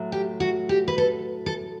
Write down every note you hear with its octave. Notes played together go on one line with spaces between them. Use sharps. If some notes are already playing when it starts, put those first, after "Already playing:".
Already playing: A2 F#3 A3
G4
F#4
G4
B4
A4
A4